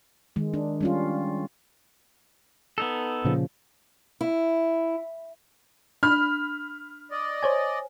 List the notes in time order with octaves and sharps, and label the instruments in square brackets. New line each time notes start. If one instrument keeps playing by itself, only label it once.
[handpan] D#3 G#3
D4
G3 C#4 F4
[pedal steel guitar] B3 D#4 A4
[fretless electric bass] A#2 C#3 F3
[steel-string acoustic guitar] E4
[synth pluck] D4 [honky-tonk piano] B5 F6
[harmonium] D5 D#5
[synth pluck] C5 C#5 G#5